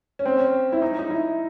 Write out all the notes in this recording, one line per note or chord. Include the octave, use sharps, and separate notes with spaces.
C#4
C4
C#4
E4
D#4
D#4
E4